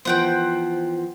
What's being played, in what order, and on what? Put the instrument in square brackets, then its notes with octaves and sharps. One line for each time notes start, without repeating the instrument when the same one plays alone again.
[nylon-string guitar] E3 F3 B3 [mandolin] C5 F#5 G5